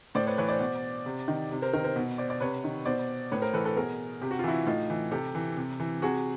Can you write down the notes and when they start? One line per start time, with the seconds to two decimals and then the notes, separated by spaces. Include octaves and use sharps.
0.15 A2 C5 D5
0.27 B4 C#5
0.37 E3 B4 C#5
0.49 C5 D5
0.60 B2
1.06 C3
1.28 D#3
1.51 C3
1.62 A#4 C5
1.73 D#3 A#4 C5
1.84 A#4 C5
1.96 B2
2.18 C5 D5
2.30 D5
2.40 C3 B4 C#5
2.64 D#3
2.86 B2 C5 D5
3.32 A2 B4 C#5
3.42 A#4 C5
3.53 E3 A4 B4
3.65 A4 B4
3.76 B2 G#4 A#4
4.21 C3 G4
4.31 F#4
4.39 F4
4.44 E3 E4 F#4
4.67 A2 D#4 F4
4.90 E3
5.11 C3 G4 A4
5.35 E3
5.57 C3
5.80 E3
6.02 C3 F#4 G#4